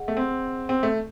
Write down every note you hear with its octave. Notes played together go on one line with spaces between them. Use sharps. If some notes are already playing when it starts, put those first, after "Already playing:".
Already playing: G#4 D#5 F#5
A3
C4
C4
A3